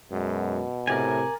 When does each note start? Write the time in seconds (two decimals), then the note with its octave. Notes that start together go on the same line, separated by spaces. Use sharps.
0.12 F#2 B2 G#3
0.87 A2 C3 A#4 D5 G#5